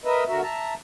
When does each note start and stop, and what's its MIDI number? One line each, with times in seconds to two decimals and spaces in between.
0.05 0.24 70
0.05 0.24 71
0.05 0.24 75
0.05 0.24 76
0.28 0.42 50
0.28 0.42 66
0.28 0.42 70
0.28 0.42 76
0.42 0.74 76
0.42 0.74 81
0.42 0.74 82